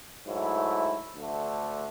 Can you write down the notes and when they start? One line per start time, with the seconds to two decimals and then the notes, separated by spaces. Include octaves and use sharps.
0.26 G#2 F#3 A3 E4
1.15 D2 D3 A3